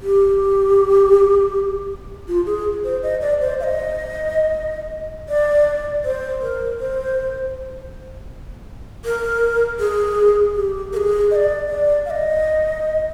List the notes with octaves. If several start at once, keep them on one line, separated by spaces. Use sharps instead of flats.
G4
F4
G#4
C5
D#5
D5
C5
F5
D#5
D5
C5
A#4
C5
A#4
G#4
G4
A#4
G#4
D#5
D5
D5
F5
D#5